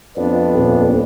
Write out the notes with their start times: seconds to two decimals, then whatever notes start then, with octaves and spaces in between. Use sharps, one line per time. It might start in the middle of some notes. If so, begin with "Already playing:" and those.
0.17 F2 B3 D4
0.54 D#1